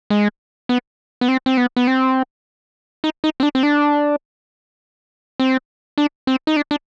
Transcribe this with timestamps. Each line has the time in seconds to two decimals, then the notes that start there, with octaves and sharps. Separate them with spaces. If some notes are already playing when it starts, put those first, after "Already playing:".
0.10 G#3
0.69 B3
1.21 B3
1.28 C4
1.46 C4
1.57 B3
1.77 B3
1.87 C4
3.04 D#4
3.24 D#4
3.40 C4
3.43 D4
3.55 C4
3.63 D4
5.40 C4
5.98 D4
6.27 C4
6.47 D#4
6.56 D4
6.71 D4